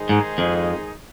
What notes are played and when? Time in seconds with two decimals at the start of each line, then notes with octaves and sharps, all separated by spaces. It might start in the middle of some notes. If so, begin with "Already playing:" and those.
Already playing: D#3 G#3 D#4 G#4 C5
0.09 G#2
0.38 F2